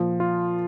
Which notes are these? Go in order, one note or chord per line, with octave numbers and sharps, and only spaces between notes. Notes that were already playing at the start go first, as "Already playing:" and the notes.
Already playing: A#2 F3
F4